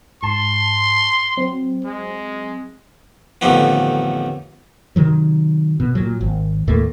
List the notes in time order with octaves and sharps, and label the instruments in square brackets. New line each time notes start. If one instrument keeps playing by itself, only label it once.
[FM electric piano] G#2 A5 [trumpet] C6
[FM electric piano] F#3 C4
[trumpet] G#3
[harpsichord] A1 F2 D3 D#3 B3
[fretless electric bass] C3 D#3 F#3
B2
A#2 F#3
G#1
D#2 A2 A3 A#3